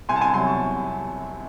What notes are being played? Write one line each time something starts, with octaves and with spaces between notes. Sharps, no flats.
C2 G#5 C6
A5
G#5 C6
C3 F#3 G#5 C6
A5 C#6
C2